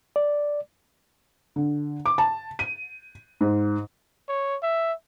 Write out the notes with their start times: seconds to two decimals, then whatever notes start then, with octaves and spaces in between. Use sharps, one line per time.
0.16 D5
1.56 D3
2.06 D6
2.18 A5
2.59 D#7
3.41 G#2
4.29 C#5
4.62 E5